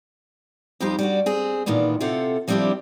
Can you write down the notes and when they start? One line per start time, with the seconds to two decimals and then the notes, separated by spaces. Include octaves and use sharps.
0.80 F2 F3 G3 D#4 G4 C5
0.99 G3 D4 F#4
1.26 C4 G#4
1.66 A#2 D#3 E3 B3 D4
2.01 C3 C4 F4 A4 F#5
2.48 F3 G3 C4 D4 E4 G4